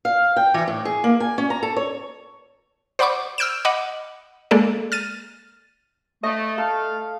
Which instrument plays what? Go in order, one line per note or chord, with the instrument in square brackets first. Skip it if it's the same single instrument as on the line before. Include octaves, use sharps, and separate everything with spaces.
[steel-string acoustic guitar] F5
G5
E3
A2
G#4
A#3
G#5
C#4
A#5
A4
C#5
[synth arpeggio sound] C5 D5 F#5 B5 C#6 D6
E6 F6 G6 D7 E7
D#5 F#5 B5 D6
G#3 A#3 A4 D5
F6 A6 D#7
[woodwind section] A3 [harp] D#5
[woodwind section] A3 F5 [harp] A4